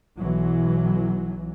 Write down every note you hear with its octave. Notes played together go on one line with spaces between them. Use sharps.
B1 E3 F#3